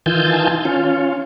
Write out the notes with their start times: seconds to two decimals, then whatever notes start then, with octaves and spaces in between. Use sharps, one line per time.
0.06 D#3 E3 F4 G#5 A5 G6
0.65 C#4 F4